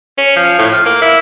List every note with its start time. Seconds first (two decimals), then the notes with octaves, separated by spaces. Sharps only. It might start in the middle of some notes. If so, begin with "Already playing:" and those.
0.18 C#4
0.37 F3
0.59 A2
0.73 F4
0.86 A#3
1.02 E4